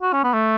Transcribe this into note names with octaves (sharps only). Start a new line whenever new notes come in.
F#4
C#4
B3
A3